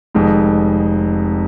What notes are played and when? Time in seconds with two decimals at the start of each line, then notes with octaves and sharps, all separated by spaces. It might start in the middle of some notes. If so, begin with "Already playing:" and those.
0.15 F1 F2 D#3 G#3 D#4